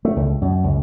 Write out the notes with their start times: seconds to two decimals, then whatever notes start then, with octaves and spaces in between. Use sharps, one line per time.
0.05 A3
0.16 C#2
0.42 F#2
0.64 C#2